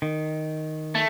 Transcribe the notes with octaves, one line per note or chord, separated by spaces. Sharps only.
D#3
A3